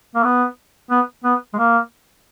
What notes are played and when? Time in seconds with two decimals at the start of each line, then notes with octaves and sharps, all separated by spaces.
0.15 A#3
0.24 B3
0.91 B3
1.24 B3
1.54 G#3
1.58 A#3